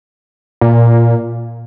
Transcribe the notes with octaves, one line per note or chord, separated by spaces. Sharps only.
A#2